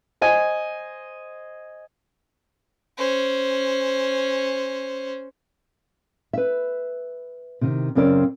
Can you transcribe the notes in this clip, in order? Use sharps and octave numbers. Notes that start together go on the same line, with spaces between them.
C5 D#5 G#5
C#4 C5
B4 E5
C3 D#3
F#2 C#3 C4 A#4 D5